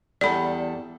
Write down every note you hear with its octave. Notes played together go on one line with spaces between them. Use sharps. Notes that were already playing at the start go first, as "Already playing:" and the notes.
E2 G3 A4 D5 B5